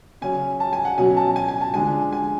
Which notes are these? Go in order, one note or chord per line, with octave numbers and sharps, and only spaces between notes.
C#3 F#3 C#4 G#5
A5
G#5
F#5
B2 F#3 C#4 G#5
A5
G#5
G#5
A5
D3 F3 G#3 D4 G#5
G#5